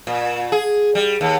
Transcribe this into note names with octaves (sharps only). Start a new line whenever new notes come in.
A#2
G#4
G3
D#2